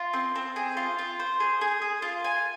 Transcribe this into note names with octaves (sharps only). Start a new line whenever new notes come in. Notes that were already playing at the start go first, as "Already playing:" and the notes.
Already playing: F4
C4
C4
G#4
F4
F4
C5
G#4
G#4
G#4
F4
G#5